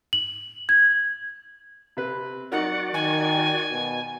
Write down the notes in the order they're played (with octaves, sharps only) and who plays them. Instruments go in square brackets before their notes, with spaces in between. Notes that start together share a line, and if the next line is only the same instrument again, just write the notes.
[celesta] F#7
G#6
[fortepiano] C3 B4
[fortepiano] F#3 D#4 A#4 [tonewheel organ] F#4 D5 [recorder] F#5
[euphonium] D#3 [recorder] G#5
[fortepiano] G5
[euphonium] B2